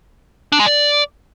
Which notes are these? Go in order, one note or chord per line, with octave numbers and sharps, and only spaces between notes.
D4
G#3
D5